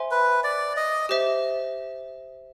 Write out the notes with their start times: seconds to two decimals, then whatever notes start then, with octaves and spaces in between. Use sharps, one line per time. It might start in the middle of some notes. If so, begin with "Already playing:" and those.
Already playing: C5 E5 G#5 C6
0.11 B4
0.44 D5
0.77 D#5
1.09 G4 C5 E5